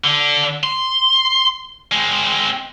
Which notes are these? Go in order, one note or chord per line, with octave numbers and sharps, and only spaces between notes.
D3 D4
C6
G#3 C4